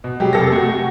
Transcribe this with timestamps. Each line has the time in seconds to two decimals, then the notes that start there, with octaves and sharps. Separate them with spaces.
0.04 B2
0.20 F#3 G3 G4 G#4
0.33 F1 A4 A#6
0.52 A3 F#4